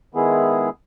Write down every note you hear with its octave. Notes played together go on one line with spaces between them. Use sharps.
D#3 G#3 B3 E4 G#4